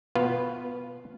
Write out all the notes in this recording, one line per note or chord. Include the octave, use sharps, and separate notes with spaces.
B2 B3 F4 B4 F5